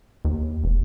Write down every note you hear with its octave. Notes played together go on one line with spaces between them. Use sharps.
D#2
E1